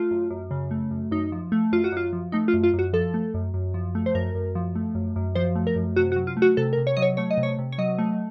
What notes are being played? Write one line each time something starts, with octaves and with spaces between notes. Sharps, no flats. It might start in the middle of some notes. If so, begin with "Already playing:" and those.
Already playing: A3 F4
F#2
F#2
C#3
A3
F#2
F#2 D#4
F3
A3
F#2 F4
F#4
F#2 F4
F3
A3 D#4
F4
F#2
F4
F#2
F#4
F3 A4
A3
F#2
F#2
F3
A3
C5
F#2 A#4
F#2
F3
A3
F#2
F#2
F3 C5
A3
A#4
F#2
C3 F#4
F#4
F#3
F4
A3
F#4
C3 A4
A#4
C3
C#5
F#3 D#5
C#5
A3 C#5
D#5
C3
C#5
C3
C#5
F#3 D#5
A3